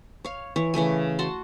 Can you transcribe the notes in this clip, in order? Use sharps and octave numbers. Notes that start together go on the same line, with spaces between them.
C#5 F5
E3 C#5
C#3 E3 A3 G#5
F#4 F#5 A5 C6